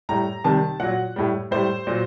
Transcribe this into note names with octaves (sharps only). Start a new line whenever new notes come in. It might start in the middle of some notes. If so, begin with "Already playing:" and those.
A2 G3 A#5
C3 D#3 G3 A5
A#2 F#3 F#5
A2 G3
A2 G3 C5
A#2 F#3